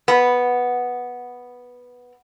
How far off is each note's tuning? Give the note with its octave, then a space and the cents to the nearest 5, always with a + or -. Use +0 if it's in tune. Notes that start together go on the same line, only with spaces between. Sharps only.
B3 -5